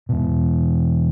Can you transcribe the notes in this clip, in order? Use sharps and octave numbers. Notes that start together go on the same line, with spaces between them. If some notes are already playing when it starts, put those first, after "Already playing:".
E2 B2